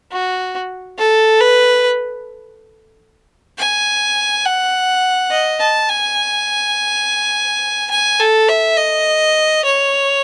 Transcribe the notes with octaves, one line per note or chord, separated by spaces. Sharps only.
F#4
A4
B4
G#5
F#5
D#5
A5
G#5
G#5
A4
E5
D#5
C#5